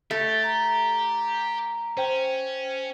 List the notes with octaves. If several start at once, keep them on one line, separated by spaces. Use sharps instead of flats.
A3 G4 E5
A#5
C#4 C5 G5